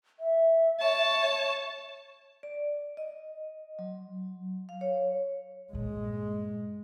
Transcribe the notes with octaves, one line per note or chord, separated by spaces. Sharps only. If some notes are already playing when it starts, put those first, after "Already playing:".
E5
C#5 A5
D5
D#5
F#3
F5
C#5
G2 A#2 G#3